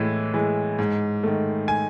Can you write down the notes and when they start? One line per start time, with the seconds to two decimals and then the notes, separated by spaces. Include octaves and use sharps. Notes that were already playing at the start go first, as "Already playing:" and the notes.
Already playing: A2 E3 G#3
0.34 E3 G#3
0.79 G#2
1.23 D#3 A3
1.68 G#5